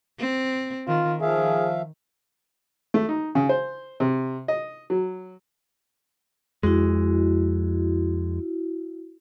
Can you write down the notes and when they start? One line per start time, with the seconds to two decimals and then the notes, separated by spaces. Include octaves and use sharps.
0.19 C4
0.87 D#3 F4
1.21 D#3 F3 G#4 E5 F5
2.94 A3
3.09 D#4
3.35 C#3
3.49 C5
4.00 C3
4.48 D#5
4.90 F#3
6.63 F2 G#3 E4 F#4